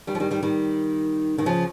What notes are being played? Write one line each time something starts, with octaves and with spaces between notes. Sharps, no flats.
D#3 G3
F3
D#3 G3
D#3 G3
D#3 G3
D#3
C#3 F3